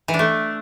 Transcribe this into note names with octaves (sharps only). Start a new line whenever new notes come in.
E3
D4
A3